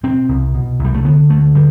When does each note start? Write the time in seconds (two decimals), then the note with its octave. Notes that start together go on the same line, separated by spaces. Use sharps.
0.03 B2 C4
0.29 C2
0.54 B2
0.79 C2
0.85 G3
0.94 A3
1.04 D3 B3
1.29 D2 A3
1.55 D3 G3